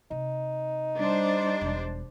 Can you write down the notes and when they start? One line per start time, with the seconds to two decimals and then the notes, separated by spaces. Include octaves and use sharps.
0.11 C3 D#4
0.97 G3 D4 C5
1.61 E1